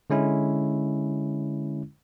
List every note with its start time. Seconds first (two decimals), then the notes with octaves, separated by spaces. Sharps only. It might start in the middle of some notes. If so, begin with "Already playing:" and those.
0.10 D3 G#3 C#4 E4